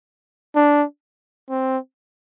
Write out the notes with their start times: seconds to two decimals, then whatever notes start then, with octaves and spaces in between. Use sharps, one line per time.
0.56 D4
1.50 C4